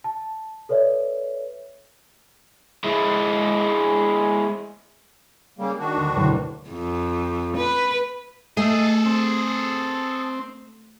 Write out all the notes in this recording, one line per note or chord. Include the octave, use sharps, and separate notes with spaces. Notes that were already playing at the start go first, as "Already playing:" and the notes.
A5
A4 B4 C#5 D5 E5
G#3 E4
C#3 G3 A#3
D#3 D4 F#4
D2 E7
F#1 D2 B2
F2
B4
A3 G#4 A4 D#5
C4